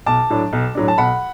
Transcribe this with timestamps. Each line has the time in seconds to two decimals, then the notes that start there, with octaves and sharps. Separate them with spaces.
0.06 B1 A5 D6
0.30 A2 F#3 D4
0.53 B1
0.75 A2 F#3 D4
0.88 A5
0.98 B1 F#5 B5